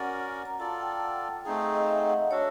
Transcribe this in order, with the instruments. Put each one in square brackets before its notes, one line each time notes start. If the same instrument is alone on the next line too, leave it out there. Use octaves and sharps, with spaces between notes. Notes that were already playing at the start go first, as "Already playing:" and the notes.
Already playing: [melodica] C#4 F#4 A#4 D5 [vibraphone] F#5
[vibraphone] A#5
[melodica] F4 A4 D5 [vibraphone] A5
[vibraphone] G5
F#5
[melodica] A3 C4 D#4 G#4 [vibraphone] F5
[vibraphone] E5
D#5
F5
E5
F#5
F#5
[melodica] D4 F#4 A4 [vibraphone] C#5